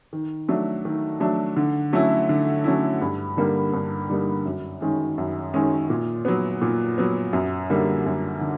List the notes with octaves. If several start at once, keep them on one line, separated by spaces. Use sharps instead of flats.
D#3
F#3 A3 D4
D#3
F#3 A3 D4
D3
F#3 A3 C#4 E4
D3
F#3 A3 C#4 E4
G2
D3 G3 A#3 D#4
G2
D3 G3 A#3 D#4
F#2
D#3 G#3 C#4
F#2
D#3 G#3 C#4
A#2
F#3 B3
A#2
F#3 B3
F#2
D3 G3 A#3
F#2
D3